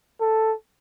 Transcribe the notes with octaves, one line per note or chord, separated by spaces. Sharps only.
A4